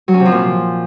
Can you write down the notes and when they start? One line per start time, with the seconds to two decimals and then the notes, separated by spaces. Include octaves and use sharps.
0.08 F#3
0.14 C#4
0.20 C3
0.26 F3
0.31 A#2